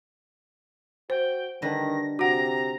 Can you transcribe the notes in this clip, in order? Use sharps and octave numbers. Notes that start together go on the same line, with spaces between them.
F#4 C5 G5
D3 D#3 G3 B4 A#6
C3 F#4 F#5 A#5